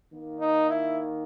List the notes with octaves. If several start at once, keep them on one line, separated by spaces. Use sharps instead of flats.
D#3 A#3
D#4
E4